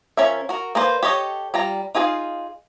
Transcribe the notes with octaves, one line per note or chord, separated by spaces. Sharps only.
F3 C#4 A#4 E5
F#4 A#4
A#3 B4 C5 D5
G4 A4 C#5 D#5
G3 F4 A#5
D#4 F4 G#4 C#5 F5